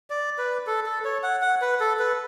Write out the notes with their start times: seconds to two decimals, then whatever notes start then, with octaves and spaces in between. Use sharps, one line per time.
0.10 D5
0.38 B4
0.67 A4
0.86 A4
1.05 C#5
1.23 F#5
1.42 F#5
1.61 B4
1.80 A4
1.99 B4